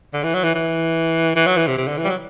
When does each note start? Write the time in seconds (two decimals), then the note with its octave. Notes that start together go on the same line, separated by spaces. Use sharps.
0.14 D3
0.23 E3
0.35 F#3
0.44 E3
0.55 E3
1.36 E3
1.46 F#3
1.57 E3
1.67 C3
1.78 C3
1.88 D3
1.98 E3
2.04 G3
2.08 F#3